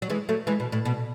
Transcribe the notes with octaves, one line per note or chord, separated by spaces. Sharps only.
F#3
E3 G#3
F#3 A3
E3 G#3
B2
A2
B2